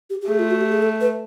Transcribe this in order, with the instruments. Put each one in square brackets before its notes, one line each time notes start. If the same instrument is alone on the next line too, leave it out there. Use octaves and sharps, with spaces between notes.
[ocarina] G4
G4
[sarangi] A3 [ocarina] G#4
[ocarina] F4
F#4
G4
G#4
A4
B4